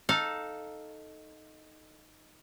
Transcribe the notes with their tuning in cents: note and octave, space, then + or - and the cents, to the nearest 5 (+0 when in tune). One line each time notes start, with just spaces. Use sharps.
D#4 +0 A4 +0 F5 +15